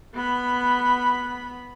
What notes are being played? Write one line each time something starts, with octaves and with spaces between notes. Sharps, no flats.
B3 B5